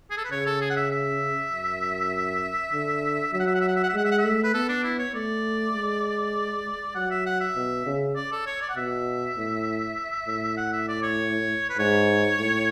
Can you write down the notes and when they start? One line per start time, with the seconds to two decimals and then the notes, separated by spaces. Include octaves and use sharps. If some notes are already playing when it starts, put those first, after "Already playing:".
0.11 G#4
0.18 A4
0.25 B4
0.31 C#3 C#5
0.46 A4
0.61 G#4
0.70 F#5
0.77 E5
0.91 E5
1.52 F#2
2.73 D3
3.33 F#3 E5
3.40 F#5
3.47 E5
3.55 F#5
3.61 E5
3.68 F#5
3.76 E5
3.83 F#5
3.89 E5
3.94 G#3 F#5
4.05 E5
4.11 F#5
4.18 E5
4.24 A3
4.44 B4
4.54 B3 A4
4.69 D4
4.84 E4
4.99 C#5
5.15 A3 D5
5.74 G#3
6.95 F#3 F#5
7.11 E5
7.26 F#5
7.41 E5
7.55 B2
7.86 C#3
8.16 D5
8.32 A4
8.46 C#5
8.62 D5
8.70 F#5
8.76 B2 E5
9.37 A2
10.28 A2
10.57 F#5
10.73 E5
10.88 D5
11.03 C#5
11.70 B4
11.78 G#2 C#5
12.39 A2